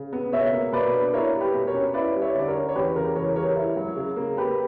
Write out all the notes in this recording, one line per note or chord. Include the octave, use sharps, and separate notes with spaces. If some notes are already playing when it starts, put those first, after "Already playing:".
Already playing: C#3
B3
B2 C#5 E5
A#3
B2 B4 D5
D4
E4 A#4 C#5
G3
G4 B4
B2
A#4 C#5
C#4
E4 B4 D5
G3
C#5 E5
D3 D5
A#4 C#5
C#4
C#5
E2 G4 B4
C#3 A#4
E2 A#4 C#5
G3 A#4 C#5
E4
F#3
C#3
A#3
A#3 G4 B4